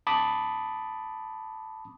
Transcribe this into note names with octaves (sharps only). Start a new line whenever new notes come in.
A5 B5 D6 D#6